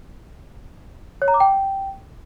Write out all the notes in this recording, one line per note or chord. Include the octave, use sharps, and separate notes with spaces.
C#5
A#5
D6
G5